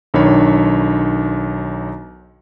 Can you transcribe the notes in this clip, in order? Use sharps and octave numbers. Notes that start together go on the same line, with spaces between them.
B1 D#3 D4 C#5 B5